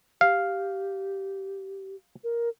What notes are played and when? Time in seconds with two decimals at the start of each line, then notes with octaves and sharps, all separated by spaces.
0.21 G4 F5
2.24 A#4